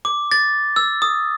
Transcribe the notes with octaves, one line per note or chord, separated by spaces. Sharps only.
D6
A6
E6
D#6